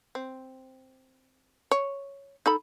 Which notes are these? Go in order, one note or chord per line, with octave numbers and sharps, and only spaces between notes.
C4
C#5
D#4 A4 B5